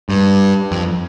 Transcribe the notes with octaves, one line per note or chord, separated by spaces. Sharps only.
G2
F2